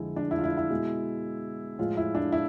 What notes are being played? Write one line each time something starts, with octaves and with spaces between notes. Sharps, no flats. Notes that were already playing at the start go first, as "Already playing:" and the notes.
Already playing: F2 D3 G#3 E4
D4
E4
F4
E4
E4
B2 G#3
A2 F3 G#3 F4
E4
D4
E4